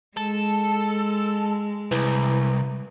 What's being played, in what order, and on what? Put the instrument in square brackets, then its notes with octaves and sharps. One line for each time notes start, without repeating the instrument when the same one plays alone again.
[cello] G#3 [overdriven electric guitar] A4
[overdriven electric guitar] C2 [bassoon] E3